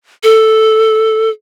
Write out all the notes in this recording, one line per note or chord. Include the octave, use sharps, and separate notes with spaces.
A4